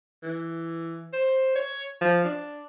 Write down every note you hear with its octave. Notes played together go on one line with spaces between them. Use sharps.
E3
C5
C#5
F3
D4